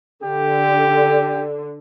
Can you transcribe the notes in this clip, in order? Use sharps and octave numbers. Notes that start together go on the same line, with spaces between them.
D3 G4